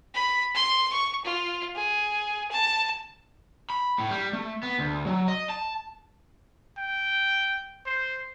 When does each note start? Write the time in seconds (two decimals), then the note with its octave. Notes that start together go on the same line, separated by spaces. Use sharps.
0.14 B5
0.55 C6
0.93 C#6
1.25 F4
1.76 G#4
2.51 A5
3.70 B5
3.99 A2
4.11 G3
4.33 A3
4.63 B3
4.79 D2
5.07 F#3
5.28 D#5
5.49 A5
6.78 G5
7.86 C5